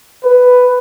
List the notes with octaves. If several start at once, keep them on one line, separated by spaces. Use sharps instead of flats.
B4